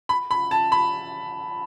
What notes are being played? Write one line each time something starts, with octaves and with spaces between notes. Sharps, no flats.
B5
B5
A5
B5